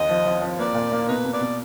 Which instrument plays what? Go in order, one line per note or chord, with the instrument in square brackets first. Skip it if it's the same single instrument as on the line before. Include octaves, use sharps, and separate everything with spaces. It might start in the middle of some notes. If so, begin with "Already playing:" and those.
Already playing: [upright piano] D#2 [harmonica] D#5
[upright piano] F3
F3
F3
[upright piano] A#3 [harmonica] B4 D5
[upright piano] A#2
A#3
[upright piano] B2 [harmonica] D#4 B4
[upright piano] B2
[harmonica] B4 D5
[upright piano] B2